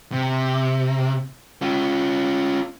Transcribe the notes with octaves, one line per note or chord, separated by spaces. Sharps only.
C3
C#4 F4